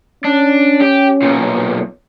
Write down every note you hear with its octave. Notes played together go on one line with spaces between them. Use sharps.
C#4 D4
G4
B1 A#2